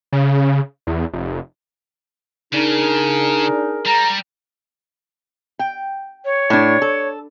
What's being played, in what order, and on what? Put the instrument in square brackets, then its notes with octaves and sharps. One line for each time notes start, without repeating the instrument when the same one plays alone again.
[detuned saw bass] C#3
E2
F1
[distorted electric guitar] C#3 [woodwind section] D4 D#4 [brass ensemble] G#4 A#4
[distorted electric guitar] G3 [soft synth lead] A#5
[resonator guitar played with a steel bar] G5
[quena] C#5
[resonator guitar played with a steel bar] A2 D4
A4